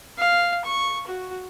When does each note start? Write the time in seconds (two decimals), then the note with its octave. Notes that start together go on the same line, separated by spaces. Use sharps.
0.18 F5
0.65 C#6
1.07 F#4